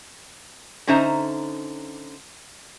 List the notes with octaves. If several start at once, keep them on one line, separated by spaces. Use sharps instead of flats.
D3 C#4 D#4 C5 E5 A#5